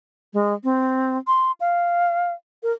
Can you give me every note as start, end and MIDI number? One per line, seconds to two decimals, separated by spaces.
0.34 0.53 56
0.64 1.17 60
1.27 1.52 84
1.60 2.33 77
2.63 2.72 70